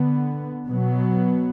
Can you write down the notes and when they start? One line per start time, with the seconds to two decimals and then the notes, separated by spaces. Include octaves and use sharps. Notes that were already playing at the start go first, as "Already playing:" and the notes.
Already playing: D3 B3
0.68 B2 F#3 B3